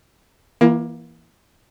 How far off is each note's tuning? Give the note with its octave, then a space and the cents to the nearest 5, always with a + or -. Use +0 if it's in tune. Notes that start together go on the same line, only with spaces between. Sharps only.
E3 +0 A#3 +25 F4 -45